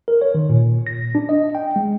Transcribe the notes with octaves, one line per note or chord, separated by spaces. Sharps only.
A#4
C#5
D#3
A#2
A#6
D4
D#5
G5
G#3